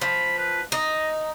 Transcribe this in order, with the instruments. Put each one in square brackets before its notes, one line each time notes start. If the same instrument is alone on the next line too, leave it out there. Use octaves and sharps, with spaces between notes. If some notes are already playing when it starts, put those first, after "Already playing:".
[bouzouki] F3 [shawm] B5
[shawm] B4
[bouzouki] D#4 [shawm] D#5